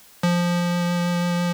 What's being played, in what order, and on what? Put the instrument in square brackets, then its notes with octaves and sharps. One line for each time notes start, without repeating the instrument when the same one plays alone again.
[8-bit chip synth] F3